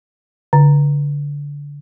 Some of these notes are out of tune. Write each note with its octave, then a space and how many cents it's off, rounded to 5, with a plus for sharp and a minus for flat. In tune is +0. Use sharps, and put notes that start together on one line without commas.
D3 -25